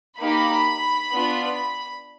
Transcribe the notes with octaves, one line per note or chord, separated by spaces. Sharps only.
A#3 D#4 G4 B5
B3 D4 F4